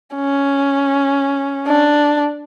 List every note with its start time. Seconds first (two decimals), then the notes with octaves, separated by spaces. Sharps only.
0.15 C#4
1.67 D4